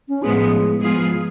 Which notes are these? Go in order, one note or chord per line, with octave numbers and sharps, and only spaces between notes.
C#4
A2 F3 G#3 B3 G#4
G#2 F3 B3 F4 G#4